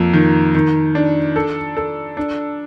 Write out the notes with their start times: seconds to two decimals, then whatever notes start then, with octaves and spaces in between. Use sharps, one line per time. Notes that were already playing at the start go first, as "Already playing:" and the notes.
Already playing: F2 A#3
0.13 D#3
0.55 D#3
0.95 D4
1.36 A4
1.77 A4
2.17 D4